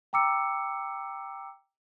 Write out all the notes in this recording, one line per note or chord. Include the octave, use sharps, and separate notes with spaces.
G5 A#5 D6 E6 C#7